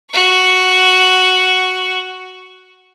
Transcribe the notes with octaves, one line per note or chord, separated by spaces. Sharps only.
F#4 C#6